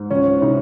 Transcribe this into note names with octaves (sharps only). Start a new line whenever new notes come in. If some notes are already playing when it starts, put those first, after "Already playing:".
Already playing: G#2
C#2 C#4
C3 D#4